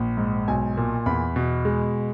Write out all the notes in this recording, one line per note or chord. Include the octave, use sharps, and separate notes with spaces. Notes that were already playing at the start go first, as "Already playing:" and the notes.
Already playing: A#1
G#2
B1 G#5
A#2
E2 B5
B2
G#3